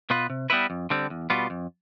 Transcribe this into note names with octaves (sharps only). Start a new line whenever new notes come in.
B2 B3 F4 B4
C3
G3 B3 E4 B4
F2
D3 G3 C4
E2
B2 G3 B3 F4
F2